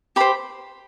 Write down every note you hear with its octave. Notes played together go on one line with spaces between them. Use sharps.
G4 C5 B5